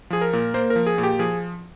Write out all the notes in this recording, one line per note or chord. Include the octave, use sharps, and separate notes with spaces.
F3 G#4
A#4
A#2
A#3 C5
A#4
F3
G#4
A#2
G4
F3 G#4